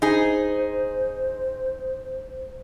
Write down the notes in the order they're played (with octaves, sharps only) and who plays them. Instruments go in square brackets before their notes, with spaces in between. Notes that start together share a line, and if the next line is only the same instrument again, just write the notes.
[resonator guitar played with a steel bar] D#4 G#4 [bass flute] C5